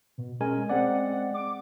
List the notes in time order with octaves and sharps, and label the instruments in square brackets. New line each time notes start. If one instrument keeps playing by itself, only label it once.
[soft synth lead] B2
[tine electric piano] G#3 A#4 G#5 [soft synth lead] C#4
[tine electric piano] G#3 C4 D5 [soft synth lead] F#5
[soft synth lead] D6